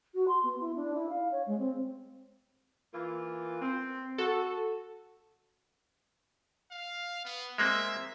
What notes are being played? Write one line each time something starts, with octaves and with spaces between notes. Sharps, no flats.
F#4
C6
B3
E4
D4
E4
F5
C#5
G#3
C4
E3 A#3 F4
C4
F#4 A4
F5
B3
G#3 A#3 C4 E5